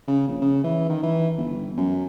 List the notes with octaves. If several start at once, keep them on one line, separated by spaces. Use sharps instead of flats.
C#3
A#1
C#3
E3
D#3
E3
G1
F#2